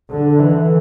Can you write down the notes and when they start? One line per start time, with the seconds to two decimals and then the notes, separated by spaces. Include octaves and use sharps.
0.10 D3
0.39 E3